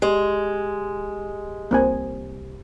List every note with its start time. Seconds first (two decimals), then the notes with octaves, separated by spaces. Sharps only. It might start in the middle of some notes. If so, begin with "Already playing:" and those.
0.02 G#3 G4
1.71 C2 A#3 C4 G#5